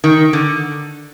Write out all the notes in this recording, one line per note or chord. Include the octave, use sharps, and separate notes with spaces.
D#3
D3